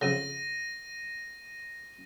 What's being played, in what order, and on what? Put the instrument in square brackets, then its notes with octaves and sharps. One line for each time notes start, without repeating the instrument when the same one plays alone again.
[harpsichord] F2 C#3 [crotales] A#6 D#7